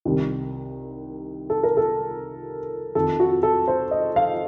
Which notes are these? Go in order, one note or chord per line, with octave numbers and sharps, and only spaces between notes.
C2 C3 D#3
A4
A#4
A4
F2 D#3 A4
F#4
A4
C5
D#5
F5